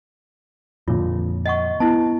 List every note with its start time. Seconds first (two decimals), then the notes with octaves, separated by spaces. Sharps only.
0.88 F2 A#2 D3 F4 C#5
1.46 D#5 F#5 C#6
1.80 B3 E4 A5